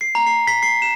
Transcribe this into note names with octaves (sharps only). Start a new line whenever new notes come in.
C7
A#5
C7
B6
C7
E7